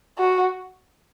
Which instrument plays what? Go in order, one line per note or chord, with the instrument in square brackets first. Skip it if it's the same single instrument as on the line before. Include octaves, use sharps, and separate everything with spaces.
[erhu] F#4